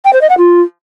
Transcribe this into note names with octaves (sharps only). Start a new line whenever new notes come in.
G5
C5
D#5
F#5
F4